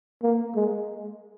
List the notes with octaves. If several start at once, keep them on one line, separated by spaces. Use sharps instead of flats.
A#3
G#3